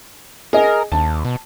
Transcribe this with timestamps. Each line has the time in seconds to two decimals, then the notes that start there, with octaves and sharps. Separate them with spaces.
0.53 G#4 A#4 D#5
0.92 D#2 A5
1.25 B2